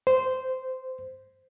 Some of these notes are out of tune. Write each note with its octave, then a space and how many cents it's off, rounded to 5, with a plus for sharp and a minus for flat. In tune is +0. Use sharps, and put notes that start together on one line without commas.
C5 -10